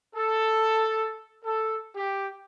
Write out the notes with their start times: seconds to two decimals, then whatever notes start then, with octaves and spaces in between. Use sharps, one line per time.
0.15 A4
1.44 A4
1.95 G4